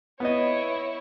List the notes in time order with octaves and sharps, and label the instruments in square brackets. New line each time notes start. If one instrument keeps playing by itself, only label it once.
[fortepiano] B3 D#5 [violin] E4 C#5